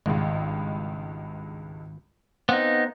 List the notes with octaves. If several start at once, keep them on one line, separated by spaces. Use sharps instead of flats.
G#1 C#2 G2 G#3
B3 C4 D#4 F5 F#5